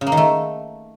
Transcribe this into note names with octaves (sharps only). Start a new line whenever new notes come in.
C#3
A#3
D#3
A3